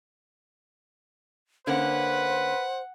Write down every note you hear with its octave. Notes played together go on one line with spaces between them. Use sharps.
D3 A#3 C#4 B4 C5 F#5